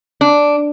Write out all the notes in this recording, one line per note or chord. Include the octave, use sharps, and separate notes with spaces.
D4